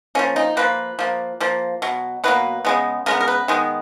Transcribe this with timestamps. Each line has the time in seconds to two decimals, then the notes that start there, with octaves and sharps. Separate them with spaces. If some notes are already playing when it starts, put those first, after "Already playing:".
0.15 F3 A#3 C#4
0.36 D#4
0.57 F3 A#3 B4
0.99 F3 A#3
1.40 F3 A#3
1.82 B2 F#3
2.24 B2 F#3 A#3 B4
2.65 C#3 G#3 B3
3.06 C#3 G#3 B3 A#4
3.21 A#4
3.28 B4
3.48 D#3 G#3 B3